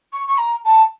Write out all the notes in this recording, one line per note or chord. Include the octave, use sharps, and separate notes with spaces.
C#6
C#6
A#5
A5